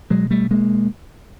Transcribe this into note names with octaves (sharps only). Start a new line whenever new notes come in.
B2 F#3 G#3
G3 A3
G#3 A#3